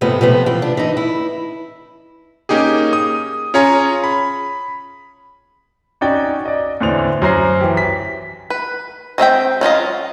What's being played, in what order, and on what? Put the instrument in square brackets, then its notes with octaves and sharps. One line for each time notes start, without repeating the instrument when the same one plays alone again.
[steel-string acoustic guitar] G#2 C3 F3 A3 B3
C3 F3 A3 B3
E3 F4
D4
E3 D#4
E4
[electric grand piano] A#3 C#4 D#4 G4 G#4
D#6
C#4 F4 G#4 C#5 G#5 A#5
B5
[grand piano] C#4 D#4 F#4 D5 G5
D5 D#5
E2 A2 D3 C5 D5 F7
F#2 F#3 C5 A#5 A#6 C7
E3 G4
B6
[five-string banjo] B4
G#3 C4 E5 G5
F#3 C#4 F4 D#5